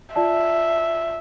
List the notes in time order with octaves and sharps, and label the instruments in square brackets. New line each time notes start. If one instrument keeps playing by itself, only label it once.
[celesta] F4 D5 A5 [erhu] E5